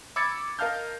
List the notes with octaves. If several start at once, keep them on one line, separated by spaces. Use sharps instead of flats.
B5 D6 E6 G#6 A6 C#7
A#4 D#5 F5 A5 F6 G6